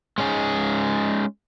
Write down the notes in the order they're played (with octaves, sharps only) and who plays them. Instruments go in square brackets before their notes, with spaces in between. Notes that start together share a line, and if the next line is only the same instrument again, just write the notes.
[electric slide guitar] G#3 C#4 D#4 G#4